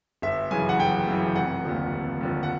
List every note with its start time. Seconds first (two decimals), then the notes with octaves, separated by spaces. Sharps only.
0.22 G1 E5
0.51 F#2 C#3 E3 G#5
0.69 F#5
0.79 G1 G5
1.08 F#2 C#3 E3
1.36 F1 F#5
1.65 D#2 D3 F3
1.93 F1
2.21 D#2 D3 F3
2.43 F#5